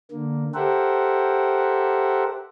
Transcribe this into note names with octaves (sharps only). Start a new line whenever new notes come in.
D3 A#3
G4 A4 A#4 C5 E5 F#5